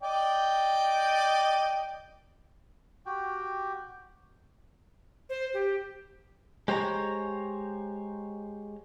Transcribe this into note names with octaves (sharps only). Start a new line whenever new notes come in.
D5 D#5 G5
F#4 G4 G5
C5
G4
G#3 G4 C5 C#5 A#5